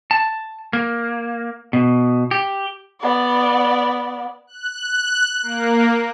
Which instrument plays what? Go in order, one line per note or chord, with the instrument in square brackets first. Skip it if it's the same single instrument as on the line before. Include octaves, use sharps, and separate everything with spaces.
[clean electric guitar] A5
A#3
B2
G4
[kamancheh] B3 D5
[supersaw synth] F#6
A#3